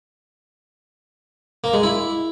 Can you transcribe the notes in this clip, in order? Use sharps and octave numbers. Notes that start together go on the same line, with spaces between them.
A#3
G#3
E4